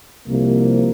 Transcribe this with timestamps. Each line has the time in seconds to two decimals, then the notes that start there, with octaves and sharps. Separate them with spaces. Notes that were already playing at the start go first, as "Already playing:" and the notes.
0.27 C2 C3 F3 A#3